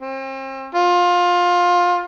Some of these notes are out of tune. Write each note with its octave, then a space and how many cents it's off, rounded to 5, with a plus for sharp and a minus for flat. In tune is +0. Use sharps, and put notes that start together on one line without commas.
C4 +40
F4 +20